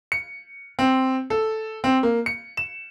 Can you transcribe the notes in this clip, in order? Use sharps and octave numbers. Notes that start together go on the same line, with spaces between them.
C#7
C4
A4
C4
A#3
C#7
E7